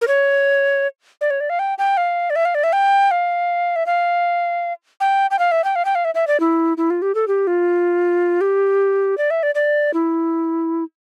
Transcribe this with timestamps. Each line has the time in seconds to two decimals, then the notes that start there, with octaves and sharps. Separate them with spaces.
0.01 A#4
0.08 C#5
1.21 D5
1.30 C#5
1.40 D5
1.50 F5
1.59 G5
1.78 G5
1.97 F5
2.30 D5
2.36 E5
2.45 F5
2.55 D5
2.64 E5
2.73 G5
3.11 F5
3.76 E5
3.86 F5
5.00 G5
5.31 G5
5.39 F5
5.52 E5
5.64 G5
5.76 F5
5.85 G5
5.95 F5
6.05 E5
6.15 E5
6.27 D5
6.40 E4
6.77 E4
6.90 F4
7.02 G4
7.15 A4
7.28 G4
7.47 F4
8.41 G4
9.18 D5
9.30 E5
9.43 D5
9.55 D5
9.94 E4